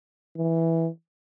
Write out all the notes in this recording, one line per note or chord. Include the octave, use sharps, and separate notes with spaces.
E3